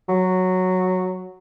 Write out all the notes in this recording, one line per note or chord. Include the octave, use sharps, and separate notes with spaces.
F#3